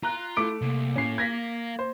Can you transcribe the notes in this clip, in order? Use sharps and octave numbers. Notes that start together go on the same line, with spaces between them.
F4 A#5 C6 F#6
A3 E4 D6 D7
C2 A#3
A2 C#4 C7
A#4 F5 G#6 A#6 B6
C5